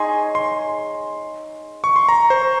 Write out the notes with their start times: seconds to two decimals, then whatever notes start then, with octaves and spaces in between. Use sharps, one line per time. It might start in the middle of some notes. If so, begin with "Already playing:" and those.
Already playing: D#4 G#4 C#5 G#5 C6
0.35 C6
1.84 C#6
1.96 C6
2.09 A#5
2.30 C5